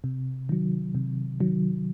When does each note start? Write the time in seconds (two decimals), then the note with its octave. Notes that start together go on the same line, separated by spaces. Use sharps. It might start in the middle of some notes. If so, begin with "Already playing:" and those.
0.04 C3
0.49 D#3 F#3
0.95 C3
1.40 D#3 F#3